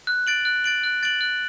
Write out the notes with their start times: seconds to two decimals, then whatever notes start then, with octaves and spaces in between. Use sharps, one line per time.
0.07 F#6
0.27 A6 D7 F#7
0.45 F#6
0.64 A6 D7 F#7
0.84 F#6
1.03 A6 D7 F#7
1.21 F#6